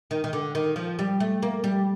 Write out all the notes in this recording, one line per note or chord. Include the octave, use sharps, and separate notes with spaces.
D#3
D#3
D3
D#3
F3
G3
A3
A#3
G3